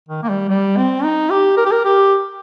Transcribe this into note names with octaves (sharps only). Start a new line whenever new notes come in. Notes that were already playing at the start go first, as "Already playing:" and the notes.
D#3
A#3
G3
G3
C4
D#4
G4
A#4
G4
A#4
G4